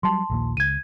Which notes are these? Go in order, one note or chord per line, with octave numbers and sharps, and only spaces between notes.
F#3 G3 A5 C6
A#1 D#2 A#2
C#2 G#6 D#7